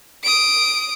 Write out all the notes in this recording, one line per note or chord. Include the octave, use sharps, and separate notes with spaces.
D#6 D7